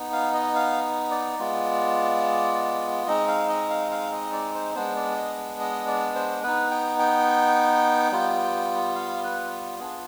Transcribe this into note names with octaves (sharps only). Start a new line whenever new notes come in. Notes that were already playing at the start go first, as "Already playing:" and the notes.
Already playing: B3 D#4
F5
D#5
F5
D5
G#3 B3 F4
G#3 C4 D#4 D#5
F5
D#5
F5
F5
D#5
D5
C5
G#3 B3 D4 C5
D5
D#5
D#5
D5
C5
B3 D#4 B4
G5
G5
G3 B3 F4
F5
B4
B3 D4 F4 G#4